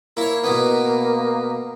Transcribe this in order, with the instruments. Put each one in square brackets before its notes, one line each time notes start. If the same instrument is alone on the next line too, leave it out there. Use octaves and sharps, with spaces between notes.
[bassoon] A#3 [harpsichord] E4 C#5
[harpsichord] B2 B3